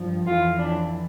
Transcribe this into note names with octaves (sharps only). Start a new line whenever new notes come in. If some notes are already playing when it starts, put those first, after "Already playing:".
Already playing: G2 F3
F2 E3 F4
D4